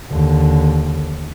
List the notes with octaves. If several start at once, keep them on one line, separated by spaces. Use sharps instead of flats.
D#2 D3